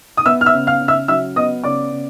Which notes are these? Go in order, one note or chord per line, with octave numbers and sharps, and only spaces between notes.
D#6
B3 E5 E6
F6
E5 E6
C#3
F5 F6
C#3
E5 E6
F#3 E5 E6
B3 D#5 D#6
C#3 D5 D6
C#3